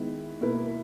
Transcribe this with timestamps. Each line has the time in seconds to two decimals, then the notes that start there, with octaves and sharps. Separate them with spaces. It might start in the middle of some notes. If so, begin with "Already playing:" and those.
Already playing: D#3 G#3 B3 E4
0.41 B2 A#3 E4 B4